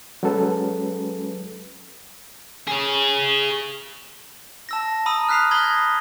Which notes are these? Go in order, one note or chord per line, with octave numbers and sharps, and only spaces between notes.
F#3 G#3 C#4 A4 B4
G#4 C#5
A5 E6 A#6
A#5 B5 D#6 E6 D#7
F6 F#6 B6 C7 F7
B5 D#6 G#6 A#6 G7